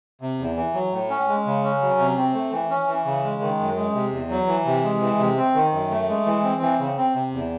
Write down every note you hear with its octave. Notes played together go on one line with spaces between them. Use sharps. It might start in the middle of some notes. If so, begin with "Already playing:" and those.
C3
E2
E3
F#3
A2
C#4
G#3
C#3
C#4
F#3
C3
C4
A3
E3
C#4
E3
C#3
G#3
D#3
F#2
G#3
C3
E2
F#3
E3
C3
G#3
E3
C3
C4
D#3
F#2
A3
G#3
E3
C4
E3
C#3
C4
C3
E2